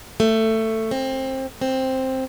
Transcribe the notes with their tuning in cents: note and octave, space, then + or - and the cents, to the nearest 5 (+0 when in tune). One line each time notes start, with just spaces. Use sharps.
A3 +15
C4 +20
C4 +5